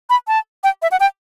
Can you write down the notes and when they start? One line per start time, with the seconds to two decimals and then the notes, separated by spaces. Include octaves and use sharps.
0.10 B5
0.28 A5
0.64 G5
0.82 E5
0.91 F#5
1.00 G5